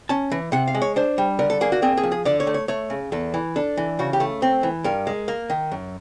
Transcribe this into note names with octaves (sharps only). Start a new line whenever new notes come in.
C#4 A5
E3
C3 F#5
F5
G#3
C#5
D4 C5
G3
D3 A#4
A4
A#3 G#4
F#4
C4 G#4
G#4
F3
G#4
D3 D5
C#5
A3
C#5
A3 C#5
C#3
E2 A4
E3
D4 A4
E3
C#3 F#4
G4
A3
C4
E3
G2 A#4
G#3
A#3
D#3
F#2